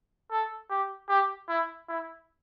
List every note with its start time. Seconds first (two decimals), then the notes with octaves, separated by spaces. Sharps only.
0.31 A4
0.70 G4
1.09 G4
1.49 E4
1.88 E4